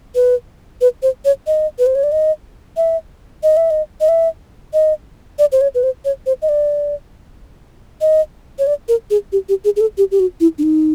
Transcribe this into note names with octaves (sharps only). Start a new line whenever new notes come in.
B4
B4
C5
C#5
D#5
B4
C5
C#5
D5
D#5
E5
D#5
E5
D#5
D#5
E5
D#5
D5
C5
C#5
B4
C5
C#5
C5
D#5
D5
D#5
C#5
D5
A#4
G#4
G4
G4
G#4
G#4
A4
G4
G4
F#4
E4
D4
D#4